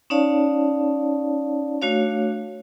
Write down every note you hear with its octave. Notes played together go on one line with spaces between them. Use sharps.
C#4 D#4 C#5 D5 F5 A5
A3 D4 F#4 C#5 F5